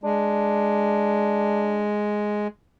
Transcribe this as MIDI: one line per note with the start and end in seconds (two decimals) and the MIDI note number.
0.04 2.48 56
0.04 1.91 62